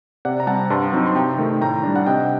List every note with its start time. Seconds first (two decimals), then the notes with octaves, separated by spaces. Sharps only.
0.25 C3 D5 F#5
0.40 A#5
0.47 G3 C4 F#5 A5
0.70 G2 A5 C6
0.92 F#3 C4 D#4
1.06 C6
1.15 C3 G5 A#5
1.38 D#3 A3 D#4
1.61 A2 G5 A#5
1.83 G3 D4
1.96 F#5
2.06 C3 D#5 G5